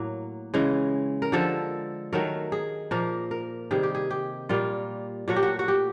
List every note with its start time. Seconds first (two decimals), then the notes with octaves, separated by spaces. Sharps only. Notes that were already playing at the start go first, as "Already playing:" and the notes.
Already playing: A2 F#3 A#3
0.54 C#3 E3 G#3
1.22 A#4
1.32 D3 F3 G#3 A4
2.13 D#3 F#3 A3 A#4
2.52 G#4
2.91 A#2 F3 A#3 A#4
3.31 A#4
3.71 C3 D#3 G3 G#4
3.83 G4
3.95 G#4
4.11 G4
4.49 A#2 G3 A#3 F4
5.28 A#2 F#3 A3 F#4
5.36 G4
5.43 F#4
5.59 F#4
5.68 G4